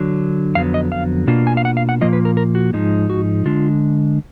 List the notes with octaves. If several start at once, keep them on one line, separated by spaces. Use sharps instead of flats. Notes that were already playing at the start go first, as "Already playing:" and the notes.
Already playing: D3 F#3 D4
F2 D3 F#3 B3 F5
D#5
F5
B2 A#3 D4 F4
G#5
F5
F#5
F5
F#5
A#2 F3 A#3 F4 D#5
B4
A#4
A#4
F#4
G#2 F3 G#3 D#4
F#4
D3 G#3 D4 F4